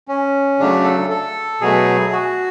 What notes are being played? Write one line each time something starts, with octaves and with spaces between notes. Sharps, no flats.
C#4
C#3 F#3 A3 D4
A4
A4
B2 F#3 A3 G#4
F#4